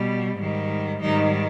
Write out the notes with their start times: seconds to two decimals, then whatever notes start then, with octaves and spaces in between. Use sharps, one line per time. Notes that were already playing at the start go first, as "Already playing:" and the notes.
Already playing: B2 G3
0.37 G#2 D#3 G3
1.00 G#2 D#3 G3 D#4